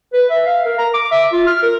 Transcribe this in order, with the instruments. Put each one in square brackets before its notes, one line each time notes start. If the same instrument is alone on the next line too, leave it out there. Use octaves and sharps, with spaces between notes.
[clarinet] B4
E5
F5
A#4
A#5
D6
E5
F4
F6
A#4